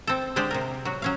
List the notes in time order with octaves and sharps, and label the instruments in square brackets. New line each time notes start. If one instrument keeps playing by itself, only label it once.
[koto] C4 A4
D3 G#3 G4 C5 D5
C3 A#4
F#3 F#4
F#3 C#4 F5